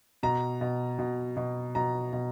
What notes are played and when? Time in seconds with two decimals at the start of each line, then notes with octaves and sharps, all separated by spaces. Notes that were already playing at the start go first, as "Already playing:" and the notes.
0.23 B2 A#5
0.61 B2
0.99 B2
1.36 B2
1.75 B2 A#5
2.13 B2